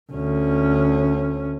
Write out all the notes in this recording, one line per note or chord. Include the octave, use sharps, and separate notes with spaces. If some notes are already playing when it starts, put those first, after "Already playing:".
D2 C#4